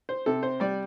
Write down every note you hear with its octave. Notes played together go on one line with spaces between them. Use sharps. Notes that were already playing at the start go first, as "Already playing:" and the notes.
C5
C3 A4
C5
G3 D5